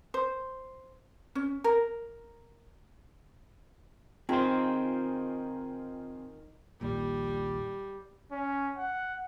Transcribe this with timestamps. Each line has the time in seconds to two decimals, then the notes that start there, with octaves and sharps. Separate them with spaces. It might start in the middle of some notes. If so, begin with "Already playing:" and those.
0.14 C5
1.35 C#4
1.64 A#4
4.29 D#3 C4 F4 G#4 C5 G5
6.81 A#1 D#2 A#2 G3
8.31 C#4
8.77 F#5